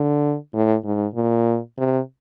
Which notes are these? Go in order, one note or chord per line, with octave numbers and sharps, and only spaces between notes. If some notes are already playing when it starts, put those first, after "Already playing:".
Already playing: D3
A2
G#2
A#2
C3